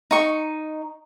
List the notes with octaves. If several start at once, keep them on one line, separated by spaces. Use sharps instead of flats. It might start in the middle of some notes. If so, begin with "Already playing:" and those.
D#4 C#6